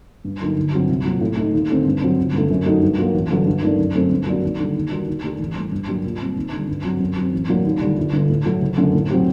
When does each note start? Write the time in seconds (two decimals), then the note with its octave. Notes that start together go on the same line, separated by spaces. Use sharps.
0.25 G2
0.40 D3 F#3 A#3 D#4
0.57 G1
0.73 G2 F#3 C4 G4
0.89 C2
1.05 A#2 F#3
1.21 A2
1.37 A3 D#4
1.53 D#2
1.70 D3 A3 C4
1.86 G2
2.02 D3 F#3 C4
2.18 G1
2.33 G2 D3 A3
2.50 F#2
2.66 F#3 A3 D#4 F#4
2.82 G2
2.98 F#3 A#3
3.14 A1
3.30 G2 D3 F#3
3.46 G2
3.62 D#3 A3 D4
3.79 F#2
3.95 D3 F#3 A3 C4
4.11 G2
4.26 F#3 A#3 D4 F#4
4.43 D#2
4.59 D3 G3
4.75 D#2
4.91 D#3 G3 D4 F#4
5.07 D#2
5.24 D#3 A3 D4 G4
5.40 A1
5.56 A2 G3
5.72 G2
5.88 F#3 A#3 D4 G4
6.05 A#2
6.20 G3 C4
6.36 D#2
6.52 D3 G3
6.68 G2
6.84 D3 F#3 C4
7.00 F#2
7.16 F#3 C4
7.33 A1
7.49 A2 F#3 A#3 D4
7.65 D#2
7.81 D3 G3 D4
7.97 G1
8.13 G2 D3
8.29 A2
8.46 F#3 A3
8.61 F#1
8.78 F#2 D3 A3
8.94 A2
9.10 F#3 C4 G4